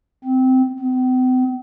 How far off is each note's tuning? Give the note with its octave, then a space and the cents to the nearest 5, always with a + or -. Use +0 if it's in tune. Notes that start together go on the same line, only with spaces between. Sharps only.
C4 -15
C4 -45